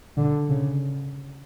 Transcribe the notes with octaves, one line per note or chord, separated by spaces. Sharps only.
D3
C#3